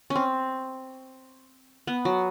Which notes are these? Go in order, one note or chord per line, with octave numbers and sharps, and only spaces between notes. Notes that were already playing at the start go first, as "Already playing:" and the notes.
C#4
C4
B3
F#3